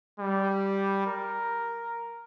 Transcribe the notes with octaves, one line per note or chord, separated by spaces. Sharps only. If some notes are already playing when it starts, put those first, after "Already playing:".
G3
A#4